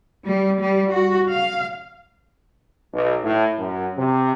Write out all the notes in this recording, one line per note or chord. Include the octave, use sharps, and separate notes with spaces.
G3
G3
F#4
F5
B1
A2
F#2
C3